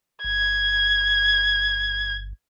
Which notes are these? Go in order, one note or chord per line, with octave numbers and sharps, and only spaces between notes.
G1 G#6